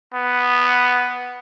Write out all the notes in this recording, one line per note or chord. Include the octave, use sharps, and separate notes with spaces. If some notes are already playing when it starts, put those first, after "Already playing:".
B3